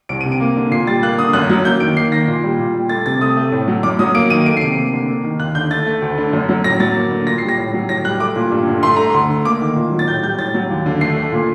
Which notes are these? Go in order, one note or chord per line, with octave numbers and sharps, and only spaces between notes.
C2 D7
C3 D#7
D7
A#3
D3
A#2 C7
G3 A6
A#3 F#6
D3 D#6
F#2 F#6
F#3
A#3 G6
D#3 D7
A#3 C7
D#3 A#6
A#2
G3
A#2
G3
A3 A6
C3 A6
A3 D#6
A3
A2
F#3
F#2 D6
F#3 D#6
A#3 D7
D#3 D#7
A3 D7
C7
C3 D7
A#3
D3
A#3
D#3
D#2 F#6
D3 G6
A3 A6
A3
D2
D3
F#2
F#3
A2 A#6
F#3 A6
A#3
D3
A#2 A#6
G3 C7
A#6
A2
F#3
A2 A#6
G3 F#6
A3 D6
A#2
G2
D3
A3 C6
A3 A#5
D2 C6
D3
A#3 D6
D#3
A#2
F#3
A6
A2 G6
G3 G6
A2 A6
F#3
D#2
D3
A3 C7
A3
A#2